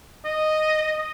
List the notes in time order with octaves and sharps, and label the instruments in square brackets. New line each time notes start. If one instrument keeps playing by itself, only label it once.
[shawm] D#5